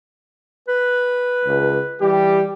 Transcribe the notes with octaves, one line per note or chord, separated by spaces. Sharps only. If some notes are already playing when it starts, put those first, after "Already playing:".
B4
C#2
E3 G3 G4